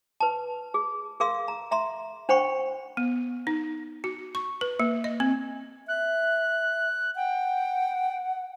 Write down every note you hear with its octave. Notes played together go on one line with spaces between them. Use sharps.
B4 A5
G#4
G#4 A#4 F5 C6 E6
A#5
E5 A#5 C6
D4 C5 F#5 G5 B5 C#6
B3
D#4
F#4
C#6
B4
A#3
D#5
C4
E5 F#6
F#5 G5